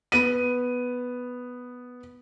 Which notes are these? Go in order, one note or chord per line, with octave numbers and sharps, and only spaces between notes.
B3 D#7